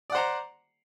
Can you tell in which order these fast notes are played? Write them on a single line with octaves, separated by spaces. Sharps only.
D5 F#5 C5 A#5